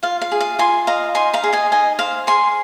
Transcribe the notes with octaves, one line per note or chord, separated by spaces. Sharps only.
F4 F5
F5
G#4
F5
F4 G#5 C6
D#5 F5 A#5
D#4 G#5 C6
F5 A#5
G#4
D#5 G#5
D#4 D#5 G#5
C5 F5
G#4 G#5 C6